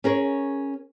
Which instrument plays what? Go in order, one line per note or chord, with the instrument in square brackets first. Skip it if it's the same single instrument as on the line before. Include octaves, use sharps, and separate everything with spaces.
[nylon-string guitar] C#4 G#4 A#4 C#5